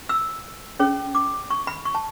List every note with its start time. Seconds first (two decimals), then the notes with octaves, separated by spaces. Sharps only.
0.09 E6
0.80 C#4 G#4 C#5
1.15 D6
1.50 C#6
1.67 B5
1.85 C#6
1.95 A5